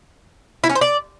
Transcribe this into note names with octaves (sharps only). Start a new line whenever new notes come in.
E4
C#4
C5
D5